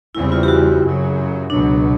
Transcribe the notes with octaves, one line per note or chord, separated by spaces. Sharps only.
E2 C#3 E3 G3 C4 E4
F4
G4
F#4
F#2 C#3 F#3
C#2 B2 F#3 D4